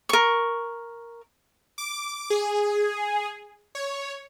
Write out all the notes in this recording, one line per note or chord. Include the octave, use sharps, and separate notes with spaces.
A#4 C#6
D6
G#4
C#5